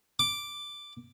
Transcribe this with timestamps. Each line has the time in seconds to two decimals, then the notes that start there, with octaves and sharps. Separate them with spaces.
0.19 D6